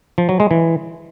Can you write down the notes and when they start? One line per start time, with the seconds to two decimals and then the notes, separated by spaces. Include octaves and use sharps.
0.18 F3
0.29 F#3
0.40 G#3
0.51 E3